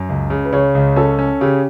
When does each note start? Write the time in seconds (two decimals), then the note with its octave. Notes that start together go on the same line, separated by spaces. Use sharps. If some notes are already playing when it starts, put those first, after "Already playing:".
Already playing: F#2
0.09 C#2
0.30 C#3
0.45 B4
0.53 C#3 C#5
0.75 C#2
0.96 C#4 A4
1.19 C#4
1.41 C#3 G4